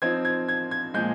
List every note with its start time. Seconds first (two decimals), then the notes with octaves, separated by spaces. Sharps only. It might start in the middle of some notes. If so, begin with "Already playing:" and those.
0.02 F3 C4 D#4 G#6
0.25 G#6
0.48 G#6
0.71 G#6
0.94 A#2 F3 G#3 G6